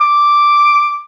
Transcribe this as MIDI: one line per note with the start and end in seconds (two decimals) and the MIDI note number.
0.01 1.04 86